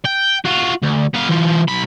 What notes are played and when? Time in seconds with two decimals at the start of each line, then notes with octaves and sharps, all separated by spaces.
0.05 G5
0.45 F4 F#4
0.82 D2
1.14 B3 F5
1.29 E3 F4
1.68 B1 B5